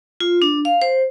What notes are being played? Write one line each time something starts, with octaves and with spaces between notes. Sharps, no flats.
F4
D4
F5
C5